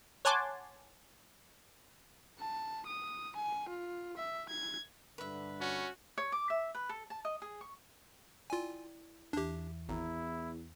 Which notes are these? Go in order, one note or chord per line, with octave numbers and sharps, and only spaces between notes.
C#5 F#5 G#5 A5 C6 D6
A5
D#6
G#5
F4
E5
G#6
G2 D3 B4 E5
C#4 F#4
C#5
D6
E5
B4
A4
A5
D#5
G#4
C#6
E4 F4 D5 G5 G#5
E2 E3 D4 G4
G#1 E2 E4 A#5